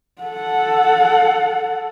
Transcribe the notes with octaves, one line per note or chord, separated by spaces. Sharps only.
A4 F#5